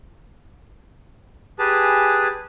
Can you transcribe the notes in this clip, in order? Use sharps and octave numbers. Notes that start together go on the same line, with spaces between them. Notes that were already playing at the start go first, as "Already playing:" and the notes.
G4 G#4 B4 G#5 A5